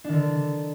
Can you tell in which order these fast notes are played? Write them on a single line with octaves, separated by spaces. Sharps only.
D4 D#3 D3